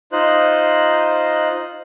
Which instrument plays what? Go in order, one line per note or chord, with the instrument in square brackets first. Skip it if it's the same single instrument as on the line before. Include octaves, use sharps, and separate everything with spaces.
[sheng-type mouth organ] D#4 F4 C5 D#5 F#6